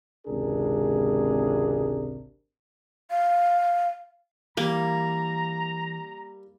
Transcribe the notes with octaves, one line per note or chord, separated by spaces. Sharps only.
G#1 C#2 C3 D4 G#4 A#4
F5
E3 G3 A#3 A#5